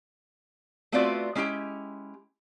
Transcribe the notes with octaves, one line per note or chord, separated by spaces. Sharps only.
A3 B3 C4 F4 F#4 D5
G#3 C#4 E4 G4 G5